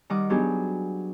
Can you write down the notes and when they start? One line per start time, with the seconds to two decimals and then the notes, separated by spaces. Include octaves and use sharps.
0.10 D#3 G3 D#5 F#5 D6
0.30 F#3 B3 D4 D#4 G4 G#4